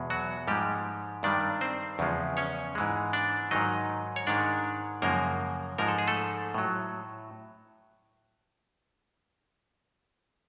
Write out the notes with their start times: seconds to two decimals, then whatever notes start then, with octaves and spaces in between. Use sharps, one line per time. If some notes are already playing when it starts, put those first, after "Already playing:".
Already playing: E2 B2 G#3
0.10 F#3 F#4
0.47 G#2 F3 G3 G#3 G4
1.23 G2 D#3 G3 D4 D5
1.61 C4 C5
1.99 E2 C#3 F3 G#3
2.37 C#4 C#5
2.75 G#2 E3 G#3
3.13 D4 D5
3.51 G#2 D#3 F#3 D#4 D#5
4.16 C#5
4.27 G#2 D#3 G#3 D4 D5
5.02 F#2 C#3 F3 G#3 A#3 A#4
5.78 G#2 F3 G#3 A#4
5.88 A4
5.99 G#4
6.08 A3 A4
6.54 A2 F#3